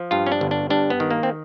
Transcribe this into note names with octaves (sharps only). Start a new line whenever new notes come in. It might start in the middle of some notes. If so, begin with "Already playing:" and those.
Already playing: F3
G2 F4
C#4
D4
G1
D4
G2 D4
B3
D#3
A#3
C4